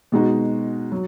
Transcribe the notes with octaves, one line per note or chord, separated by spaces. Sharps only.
B2 G#3 D#4 F#4
F#3